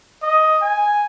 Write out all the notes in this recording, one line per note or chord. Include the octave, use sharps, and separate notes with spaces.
D#5
G#5